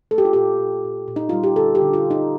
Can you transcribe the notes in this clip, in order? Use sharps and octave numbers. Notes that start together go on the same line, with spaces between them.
A3 A4
G4
F4
A#2 G4
A#2
A#2
A#2
D#4
G3 F4
G4
D3 A4
G4
D3
F4
D3
D#4